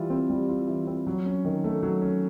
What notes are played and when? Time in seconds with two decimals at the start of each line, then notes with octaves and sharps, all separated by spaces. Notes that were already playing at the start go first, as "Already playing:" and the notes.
Already playing: E3 G3 F4
0.10 C4
0.30 G3
0.49 F4
0.68 E3
0.87 C4
1.07 F#3
1.26 C#4
1.45 D#3
1.64 A3
1.83 F#3
2.02 C#4